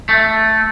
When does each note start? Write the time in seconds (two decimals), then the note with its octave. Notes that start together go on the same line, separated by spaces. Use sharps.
0.09 A3